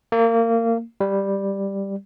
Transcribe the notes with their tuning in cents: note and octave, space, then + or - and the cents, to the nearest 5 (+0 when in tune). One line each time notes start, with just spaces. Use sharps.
A#3 -25
G3 +5